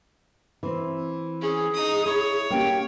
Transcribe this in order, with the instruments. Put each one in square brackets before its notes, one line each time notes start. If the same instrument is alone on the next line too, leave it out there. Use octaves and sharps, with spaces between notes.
[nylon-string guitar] E3 C4
[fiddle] C#4 [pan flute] G#4
[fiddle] D#4 D#6
[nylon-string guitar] E4 [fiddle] C#5
[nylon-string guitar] A#3 C#4 G4 [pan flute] G5